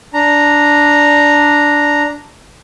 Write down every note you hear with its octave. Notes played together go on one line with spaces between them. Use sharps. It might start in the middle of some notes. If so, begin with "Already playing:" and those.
D4 A#5